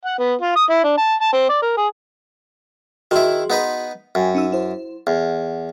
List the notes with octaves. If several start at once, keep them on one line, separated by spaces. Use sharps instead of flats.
F#5
B3
F4
D#6
E4
D4
A5
A5
C4
D5
A#4
G#4
D#3 E4 F#4 G#4 C6
B3 D#4 B4
F#2 G5 G#5
C#4 D#4 E6
E4 C5
E2 F#5